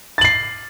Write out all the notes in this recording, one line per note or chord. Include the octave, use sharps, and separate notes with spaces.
A6 C7 F#7